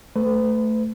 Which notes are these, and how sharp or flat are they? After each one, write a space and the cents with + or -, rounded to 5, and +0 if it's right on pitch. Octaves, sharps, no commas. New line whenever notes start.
A3 +0 B4 +40